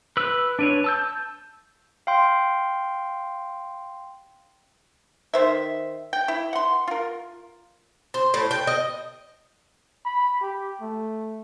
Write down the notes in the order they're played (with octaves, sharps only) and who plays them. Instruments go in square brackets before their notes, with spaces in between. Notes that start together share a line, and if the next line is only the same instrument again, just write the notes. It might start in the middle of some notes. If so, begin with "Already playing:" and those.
[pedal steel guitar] B4 E6
D4 B4 C#5
A5 E6 G6
[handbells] F5 G5 C6
[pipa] D#3 C5 E5
G5
E4
F#5 C6
F4 A#4
[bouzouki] C5
A2
G5
D#5
[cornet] B5
G4
A3